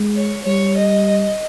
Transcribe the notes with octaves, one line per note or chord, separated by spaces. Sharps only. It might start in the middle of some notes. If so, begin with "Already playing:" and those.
Already playing: G#3
C#5
G3 C#5
D#5